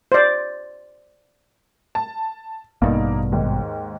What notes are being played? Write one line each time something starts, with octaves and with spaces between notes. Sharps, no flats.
C5 D5
A5
A1 G2 B2 A#3 D#4
D#2 G#2